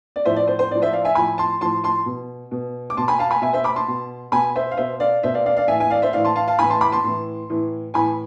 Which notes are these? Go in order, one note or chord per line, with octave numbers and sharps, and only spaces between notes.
D5
A2 F3 C5 E5
D5
C5
C5
A2 F3 D5
C5 E5
D5 F5
E5 G#5
A2 F3 G#5 B5
A5 C6
A2 F3 A5 C6
A5 C6
B2
B2
D6
B2 A5 C6
G#5 B5
F5 A5
G#5 B5
B2 E5 G#5
C5 E5
B5 D6
A5 C6
B2
B2 G#5 B5
C5 E5
F5
B2 C5 E5
D5 F5
B2 C5 E5
D5 F5
D5 F5
D5 F5
A2 E3 E5 G#5
E5 G#5
D5 F5
C5 E5
A2 E3 D5 F5
A5 C6
F5 A5
F5 A5
A2 E3 G#5 B5
A5 C6
B5 D6
A5 C6
A2 E3
A2 E3
A2 E3 G#5 B5